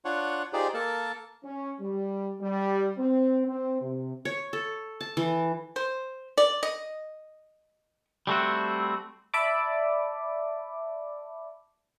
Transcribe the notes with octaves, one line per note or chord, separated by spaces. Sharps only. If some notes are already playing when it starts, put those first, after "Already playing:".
D4 F4 C#5 F#5
D#4 F4 G4 G#4 C5 D5
A#3 A4 A#4 A5
C#4
G3
G3
C4
C4
C3
C#5
A4
A5
E3
C5
D5
D#5
G3 A3 C4 F#4
D5 E5 A5 B5 D6